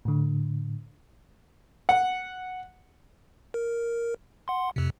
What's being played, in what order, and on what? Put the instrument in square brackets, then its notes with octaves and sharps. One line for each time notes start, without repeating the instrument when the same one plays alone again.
[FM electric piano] A2 D3
[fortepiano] F#5
[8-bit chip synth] A#4
F#5 C6
F2 C3